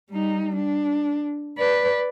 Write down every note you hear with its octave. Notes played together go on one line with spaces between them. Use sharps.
G3 D#4
D4
B4 D5